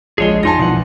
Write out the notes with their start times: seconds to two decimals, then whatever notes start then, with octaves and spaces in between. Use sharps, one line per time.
0.18 A#1 G#3 G#4 C#5 G7
0.43 F2 D#4 G#5 A5 C6 A#6
0.59 A#1 B2 E3 F#5